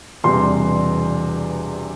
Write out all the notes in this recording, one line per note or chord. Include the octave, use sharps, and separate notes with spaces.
E1 E2 C3 G3 C6